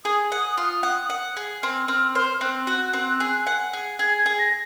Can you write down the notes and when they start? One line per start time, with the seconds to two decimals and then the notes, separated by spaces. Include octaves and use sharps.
0.05 G#4 D#6
0.32 F#5
0.57 F4
0.83 F#5
1.10 F#5
1.37 G#4
1.62 C4 F6
1.88 C4 F6
2.15 C5 F6
2.41 C4 F#6
2.67 F#4
2.93 C4
3.20 G#4
3.47 F#5
3.73 G#4
3.99 G#4 G#6
4.19 G#6
4.26 G#4
4.39 A#6